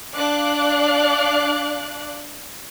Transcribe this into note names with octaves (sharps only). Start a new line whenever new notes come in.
D4 D5 F5 D6 F#6